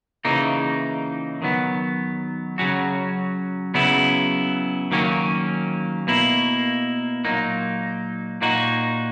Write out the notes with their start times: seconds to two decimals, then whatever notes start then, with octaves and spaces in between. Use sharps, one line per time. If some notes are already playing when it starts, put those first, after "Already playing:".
0.25 C#3 E3 A#3 D#4
1.42 D#3 F#3 B3
2.58 C#3 F#3 C#4 F#4
3.74 C#3 F#3 B3 E4
4.91 D#3 F#3 A#3 C#4
6.07 B2 A#3 E4
7.25 A#2 F#3 A#3 D#4
8.41 A#2 A#3 D#4 F#4